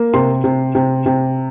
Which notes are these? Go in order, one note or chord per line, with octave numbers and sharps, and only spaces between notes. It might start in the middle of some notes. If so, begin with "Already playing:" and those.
Already playing: A#3
C3 C6
C3
C3
C3